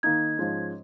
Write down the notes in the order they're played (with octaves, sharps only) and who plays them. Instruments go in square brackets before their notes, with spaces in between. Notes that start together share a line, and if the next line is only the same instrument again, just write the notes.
[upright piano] D#3 A#3 D#4 [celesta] G#6
[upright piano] G#2 F3 G#3 C#4